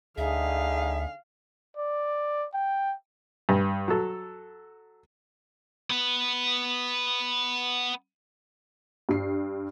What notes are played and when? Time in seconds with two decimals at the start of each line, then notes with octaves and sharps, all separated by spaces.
0.18 D2 D3 D#4 G#4 E5 F5
1.77 D5
2.54 G5
3.49 G2
3.88 F#3 A4
5.90 B3 B4
9.09 G2 C7